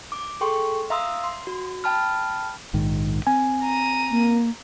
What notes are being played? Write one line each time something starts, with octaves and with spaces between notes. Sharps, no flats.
D6
G#4 A4 G5 C6 C#6
E5 F5 A#5 C6 D#6 E6
C6
F#4
G5 A5 B5 F6
A#1 G#2 D#3
C4 G#5
A#5 D#7
A#3